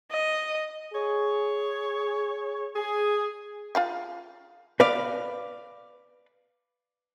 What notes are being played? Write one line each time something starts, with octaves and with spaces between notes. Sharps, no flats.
D#5
G#4 C#5
G#4
F4 F5 G5
B4 D5 F5